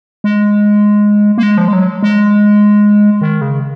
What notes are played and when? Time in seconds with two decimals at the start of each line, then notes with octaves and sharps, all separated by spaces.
0.24 G#3
1.38 A#3
1.43 G#3
1.58 F3
1.68 G#3
1.73 F#3
2.03 G#3
3.21 D#3
3.41 C#3